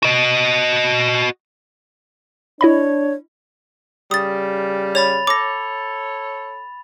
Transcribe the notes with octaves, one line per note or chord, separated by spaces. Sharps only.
F#4 D#5
D4 E4 C#5 D#5 B5
C#3 G3 D#6 A6
C#5 B5 A6 F7
A4 C#5 D6 A#6